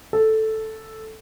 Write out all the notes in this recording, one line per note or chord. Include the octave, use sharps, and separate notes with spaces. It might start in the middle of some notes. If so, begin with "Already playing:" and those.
A4